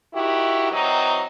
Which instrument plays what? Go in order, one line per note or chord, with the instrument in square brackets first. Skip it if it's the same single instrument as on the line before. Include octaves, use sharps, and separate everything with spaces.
[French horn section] D#3 E4 F#4 G4
E3 F#3 C4 D#4